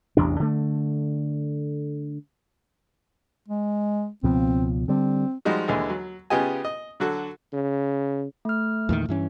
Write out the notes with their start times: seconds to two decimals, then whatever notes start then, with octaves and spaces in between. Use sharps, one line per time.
0.17 A1 E2 C3 D4
0.40 D3 A3
3.48 G#3
4.23 C#2 B2 F3 C4
4.88 D3 G3 C4
5.45 F3 G3 G#3 D#4 F#4
5.68 D#2 D3 E3 G#3
5.90 F#3
6.30 C#3 B3 F4 G4 D#5 G#5
6.65 D#5
7.00 D3 F#3 F#4 A4
7.53 C#3
8.45 A3 F6
8.89 E2 A#2 D#3
9.09 G2 E3 C#4